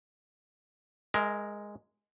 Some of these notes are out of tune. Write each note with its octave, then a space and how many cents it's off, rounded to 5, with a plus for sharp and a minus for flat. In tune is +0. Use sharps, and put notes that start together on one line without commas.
G#3 -5 A#4 +0 E5 -40